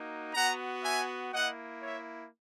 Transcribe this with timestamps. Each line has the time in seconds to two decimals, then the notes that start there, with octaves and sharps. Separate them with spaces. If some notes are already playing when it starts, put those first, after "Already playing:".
Already playing: A#3 D#4 F#4
0.34 B3 F#4 F#5 A#5
0.83 E5 G#5
1.32 A#3 E4 D#5 F#5
1.82 C#5 E5